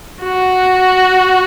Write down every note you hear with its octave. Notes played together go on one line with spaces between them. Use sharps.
F#4